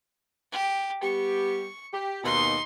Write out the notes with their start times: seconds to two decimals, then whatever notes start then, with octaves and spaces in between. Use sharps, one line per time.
0.52 G4
1.03 G3 B3 G4 C#6
1.93 G4
2.24 D#2 B2 D#4 C6